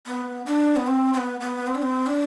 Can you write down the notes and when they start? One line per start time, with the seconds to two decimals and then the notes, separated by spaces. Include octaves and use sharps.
0.06 B3
0.46 D4
0.76 B3
0.87 C4
1.14 C4
1.18 B3
1.41 B3
1.67 C4
1.75 D4
1.82 C4
2.06 D4